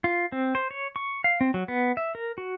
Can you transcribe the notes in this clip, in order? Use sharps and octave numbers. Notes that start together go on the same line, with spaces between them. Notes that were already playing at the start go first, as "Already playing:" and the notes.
F4
C4
C5
C#5
C#6
F5
C4
F#3
B3
E5
A#4
F#4